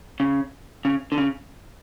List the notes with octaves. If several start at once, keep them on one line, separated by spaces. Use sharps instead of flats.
C#3
C#3
D3
C#3